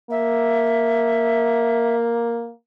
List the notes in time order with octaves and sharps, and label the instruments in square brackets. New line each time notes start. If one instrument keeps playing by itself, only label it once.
[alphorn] A#3 [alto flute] E5